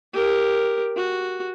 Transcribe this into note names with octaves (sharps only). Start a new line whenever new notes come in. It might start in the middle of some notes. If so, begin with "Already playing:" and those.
G4 A#4
F#4